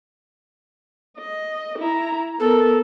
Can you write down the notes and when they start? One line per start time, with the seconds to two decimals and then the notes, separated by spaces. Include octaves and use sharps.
1.17 D#5
1.79 E4 A#5
2.40 B3 A4 A#4